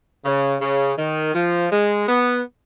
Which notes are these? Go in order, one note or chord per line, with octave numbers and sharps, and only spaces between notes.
C#3
C#3
D#3
F3
G#3
B3